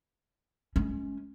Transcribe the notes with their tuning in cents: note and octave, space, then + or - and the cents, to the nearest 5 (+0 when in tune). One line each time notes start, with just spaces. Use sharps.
G#3 +30 C#4 +0